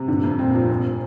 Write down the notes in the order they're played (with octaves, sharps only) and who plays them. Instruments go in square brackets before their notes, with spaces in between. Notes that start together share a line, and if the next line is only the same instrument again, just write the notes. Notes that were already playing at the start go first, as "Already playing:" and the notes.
Already playing: [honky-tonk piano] C3
[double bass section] G2 A#2 [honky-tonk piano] D3
[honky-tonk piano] F2
[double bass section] G2 A#2 [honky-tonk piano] C4
[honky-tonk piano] F3
F1